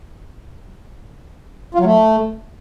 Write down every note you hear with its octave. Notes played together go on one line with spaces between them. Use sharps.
F4
F#3
A3